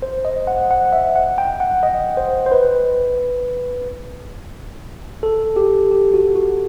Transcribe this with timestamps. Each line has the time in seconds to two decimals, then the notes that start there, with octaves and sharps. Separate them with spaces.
0.02 C5
0.25 D#5
0.47 F#5
0.71 F#5
0.93 E5
1.16 F#5
1.38 G5
1.60 F#5
1.83 D#5
2.17 C5
2.46 C5
2.52 B4
5.23 A4
5.56 G4
5.91 G4
6.14 F#4
6.36 F#4